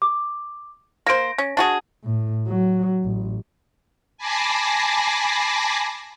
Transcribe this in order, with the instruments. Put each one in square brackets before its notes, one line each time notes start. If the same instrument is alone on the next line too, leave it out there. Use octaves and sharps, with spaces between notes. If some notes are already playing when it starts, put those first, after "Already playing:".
[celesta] D6
[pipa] A#3 C5 [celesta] A#6 D7
[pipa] C#4
D4 F#4 G#4
[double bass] A2
F#3
A1
[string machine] G#5 A5 B5 D6 A#6 C7